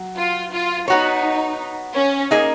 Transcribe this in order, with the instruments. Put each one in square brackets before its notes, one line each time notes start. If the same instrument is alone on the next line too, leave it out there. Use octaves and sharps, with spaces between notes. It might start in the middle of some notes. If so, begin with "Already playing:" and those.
Already playing: [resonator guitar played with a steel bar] F#3
[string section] F4
F4
[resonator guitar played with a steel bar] B3 F#4 C#5 [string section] D#4
[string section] C#4
[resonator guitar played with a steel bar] A#3 D#4 G#4 D#5